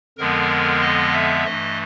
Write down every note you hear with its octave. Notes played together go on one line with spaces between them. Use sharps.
F2 D3 F3 G#3 B3 A#4
D#5
E5
G2 E3 A3 D#5